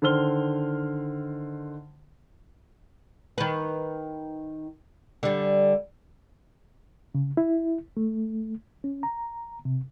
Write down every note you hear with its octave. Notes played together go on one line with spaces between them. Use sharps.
D3 D#3 C5 F6 G7
D#3 B4
D3 G3
C#3
E4
A3
C#4
A#5
C3